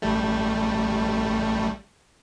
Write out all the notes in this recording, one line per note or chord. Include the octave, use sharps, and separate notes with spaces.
A1 G3 A3